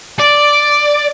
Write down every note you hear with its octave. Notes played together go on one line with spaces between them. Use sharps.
D5